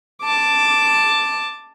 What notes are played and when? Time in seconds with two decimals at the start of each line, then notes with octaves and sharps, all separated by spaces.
0.22 A5 D6